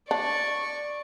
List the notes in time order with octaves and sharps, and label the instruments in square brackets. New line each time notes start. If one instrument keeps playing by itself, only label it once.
[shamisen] D4 [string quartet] D5 C#6